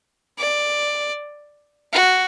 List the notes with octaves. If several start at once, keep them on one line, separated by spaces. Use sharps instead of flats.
D5
F#4